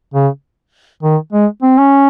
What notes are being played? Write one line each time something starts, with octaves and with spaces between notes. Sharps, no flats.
C#3
D#3
G#3
C4
C#4